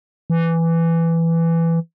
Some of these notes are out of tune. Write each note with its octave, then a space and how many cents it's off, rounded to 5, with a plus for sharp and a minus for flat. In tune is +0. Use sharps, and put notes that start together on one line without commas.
E3 +10